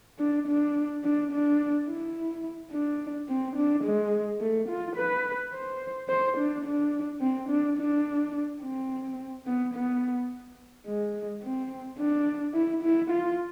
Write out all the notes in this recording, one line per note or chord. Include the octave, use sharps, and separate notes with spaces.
D4
D4
D4
D4
E4
D4
C4
D4
G#3
A3
F4
B4
C5
C5
D4
D4
C4
D4
D4
C4
B3
B3
G#3
C4
D4
E4
E4
F4